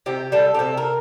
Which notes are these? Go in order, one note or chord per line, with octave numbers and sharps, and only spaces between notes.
C3 G4
G3 A4
G4
C3 A4
A#4